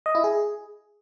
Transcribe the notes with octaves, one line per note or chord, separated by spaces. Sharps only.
D#5
E4
G#4